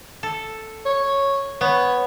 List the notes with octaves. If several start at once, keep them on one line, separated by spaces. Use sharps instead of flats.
A4
C#5
B3 C#5